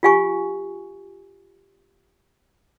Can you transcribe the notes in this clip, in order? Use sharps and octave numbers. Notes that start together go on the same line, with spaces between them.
F4 G4 F5 G#5 C#6